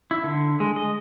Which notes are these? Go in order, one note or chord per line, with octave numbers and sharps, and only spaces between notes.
E4
D3
G#3
D#5